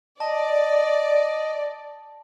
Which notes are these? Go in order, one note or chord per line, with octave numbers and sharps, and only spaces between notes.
D5 D#5 A5